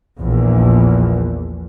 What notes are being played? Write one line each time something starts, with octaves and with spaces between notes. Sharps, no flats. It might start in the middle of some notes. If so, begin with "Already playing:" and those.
A#1 E2